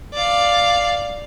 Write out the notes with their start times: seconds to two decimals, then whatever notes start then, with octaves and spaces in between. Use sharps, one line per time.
0.14 D5 F5